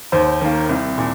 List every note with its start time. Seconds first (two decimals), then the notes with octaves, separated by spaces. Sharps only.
0.12 D#2 C5
0.41 D#3 A#3
0.69 C2
0.98 A#2